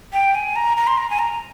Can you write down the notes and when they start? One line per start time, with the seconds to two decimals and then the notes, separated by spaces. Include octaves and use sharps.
0.13 G5
0.35 G#5
0.56 A#5
0.77 A#5
0.87 C6
0.98 A#5
1.10 G#5
1.19 A#5